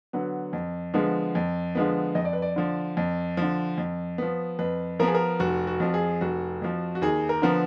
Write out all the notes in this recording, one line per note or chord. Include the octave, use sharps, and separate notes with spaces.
D3 F#3 B3
F2
D3 F3 G#3 B3
F2
D3 F3 G#3 B3
F2 D#5
D5
B4
D5
D3 F3
F2
D3 F3
F2
F3 B3
F2 B4
F3 B3 G#4 A#4
A#4
F1 F#4
F#4
F2 F3
G#4
F1 F#4
F2 F3
F#4
D#2 G#4
A#4
D3 F3 B3